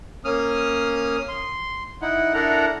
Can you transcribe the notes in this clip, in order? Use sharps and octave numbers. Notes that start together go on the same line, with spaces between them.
A#3 C#4 D#6 F6
C6
D#4 E4 F#5
D4 E4 A4 A#4 F#5 A#5